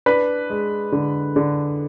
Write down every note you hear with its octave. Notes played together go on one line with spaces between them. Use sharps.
D4 B4 B5
G#3
D3
D3